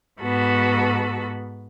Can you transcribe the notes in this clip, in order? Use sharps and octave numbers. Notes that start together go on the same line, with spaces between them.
G#2 B3 F#4 A4 B5